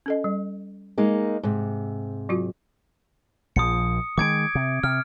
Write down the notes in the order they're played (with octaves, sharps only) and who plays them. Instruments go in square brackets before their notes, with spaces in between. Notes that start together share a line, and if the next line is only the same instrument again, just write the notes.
[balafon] C#4 A4 D#5
G3
[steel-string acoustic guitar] G#3 A#3 D#4
G#2 C3
[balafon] F#3 F4 F#4
[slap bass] A#1 F3 [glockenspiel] D#6 C#7
[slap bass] D#3 G3 G#3 [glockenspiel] D6 G#6 D7
[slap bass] C3
[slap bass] C3 [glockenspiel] F6